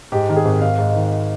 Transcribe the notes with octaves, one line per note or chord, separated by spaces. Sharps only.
G#2 G4
D#3
G#4
G#1
G#1 F5
G#2
D#3